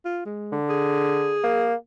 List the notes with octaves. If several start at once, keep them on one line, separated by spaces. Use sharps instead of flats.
F4
G#3
D3
G#4
A#3